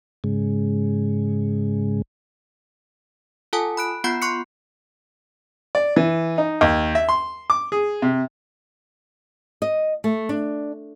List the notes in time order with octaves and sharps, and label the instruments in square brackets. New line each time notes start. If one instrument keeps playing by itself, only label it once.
[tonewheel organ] G#2 C#3 G#3
[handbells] F4 A4 F#5 G#5 A5 D#6
B5 F#6 D7
B3 F4 F#5 B5 G6 C7
C6 C#6 F#6 C7 C#7
[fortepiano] D5
E3
D#4
D#2
E5
C6
D6
G#4
C3
[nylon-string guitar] D#5
A3
D4